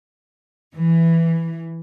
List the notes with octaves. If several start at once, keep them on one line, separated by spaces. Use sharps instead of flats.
E3